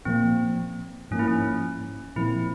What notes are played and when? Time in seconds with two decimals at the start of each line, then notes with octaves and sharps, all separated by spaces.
0.05 A#2 F3 A#3 C4
1.11 G#2 F3 A#3 C#4
1.19 E4
1.28 C#4
2.16 A#2 F3 C4 E4